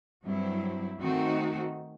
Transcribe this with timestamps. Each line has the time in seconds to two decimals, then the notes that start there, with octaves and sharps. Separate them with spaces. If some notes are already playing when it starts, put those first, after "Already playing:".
0.25 G2 F#3 C4 E4
0.99 D#3 A3 C4 D#4 F#4